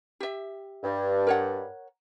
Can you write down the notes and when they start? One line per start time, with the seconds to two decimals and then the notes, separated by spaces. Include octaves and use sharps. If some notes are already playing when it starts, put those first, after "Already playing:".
0.20 G4 E5
0.83 G2
1.27 A#4 C#5 F#5